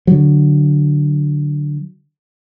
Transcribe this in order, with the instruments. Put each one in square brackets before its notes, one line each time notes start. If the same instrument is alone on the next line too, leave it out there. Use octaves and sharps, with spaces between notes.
[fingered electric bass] D3 F#3